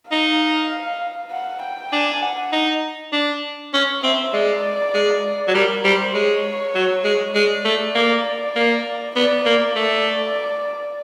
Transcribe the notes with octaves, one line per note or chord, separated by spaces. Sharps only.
D#4 F5
F#5
G5
D4 G#5
F#5
D#4
D4
C#4
C4 E5
G#3 D5
G#3
F#3
G3 A#4
G3 C5
G#3 C#5
F#3
G#3
G#3 D5
A3
A#3
A#3
B3 D5
A#3 D5
A3